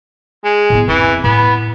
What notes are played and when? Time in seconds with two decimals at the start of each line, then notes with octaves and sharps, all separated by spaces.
0.44 G#3
0.70 A2 B3
0.88 F2 E3 C4
1.24 A2 B3